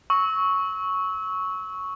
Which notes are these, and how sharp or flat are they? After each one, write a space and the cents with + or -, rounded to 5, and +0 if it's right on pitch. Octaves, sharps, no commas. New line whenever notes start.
C#6 +0 E6 -25